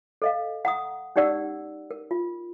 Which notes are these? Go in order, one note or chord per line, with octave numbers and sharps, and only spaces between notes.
A4 D#5 F5
F#5 A#5 D#6
C#4 D#4 G4 D5 F#5 E6
A#4
F4